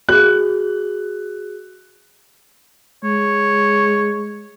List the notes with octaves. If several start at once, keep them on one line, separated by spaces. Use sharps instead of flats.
F#4 G#4 F#6
G#3 C#5